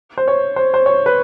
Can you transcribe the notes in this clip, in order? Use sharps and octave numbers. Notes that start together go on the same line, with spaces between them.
C5
C#5
C5
C5
C#5
B4